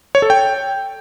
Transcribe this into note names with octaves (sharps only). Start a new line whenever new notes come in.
C#5
A4
G5